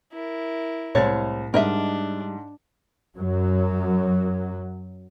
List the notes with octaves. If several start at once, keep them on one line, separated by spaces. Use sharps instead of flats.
E4 A#4
C2 A2 G#3 C4 C#5 A6
G#2 G3 D4 A#4 D#5 E5
F#2 F#3